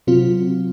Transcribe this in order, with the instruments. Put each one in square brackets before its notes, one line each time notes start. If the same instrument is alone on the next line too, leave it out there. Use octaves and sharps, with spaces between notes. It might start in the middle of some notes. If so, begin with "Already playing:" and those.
[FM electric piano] C3 F#3 C4 F4